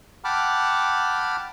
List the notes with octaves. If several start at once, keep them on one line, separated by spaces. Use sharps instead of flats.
F#5 G5 A5 B5 D6 F6